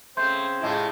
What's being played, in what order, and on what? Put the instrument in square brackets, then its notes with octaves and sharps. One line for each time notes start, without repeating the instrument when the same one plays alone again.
[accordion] C#3 C4 C5 [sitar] A3 [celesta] C6 G6
[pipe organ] A2 [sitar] C3 G#3 F4